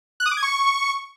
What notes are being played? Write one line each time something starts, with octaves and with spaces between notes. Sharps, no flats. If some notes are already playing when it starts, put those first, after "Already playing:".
F#6
D#6
D6
G#6
C#6